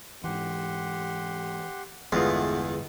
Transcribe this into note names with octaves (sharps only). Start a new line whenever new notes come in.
G#2 E3 G4 F#5 C6
G1 E2 D3 G#3 A3 B3 F4